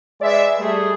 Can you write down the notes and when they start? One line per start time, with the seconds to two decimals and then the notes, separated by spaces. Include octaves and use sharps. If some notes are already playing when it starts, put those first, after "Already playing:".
0.22 G#3 B4 D5 E5
0.59 G3 A3 G#4